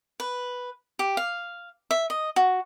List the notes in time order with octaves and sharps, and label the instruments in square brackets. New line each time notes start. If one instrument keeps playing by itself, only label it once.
[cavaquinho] B4
G4
F5
E5
D#5
F#4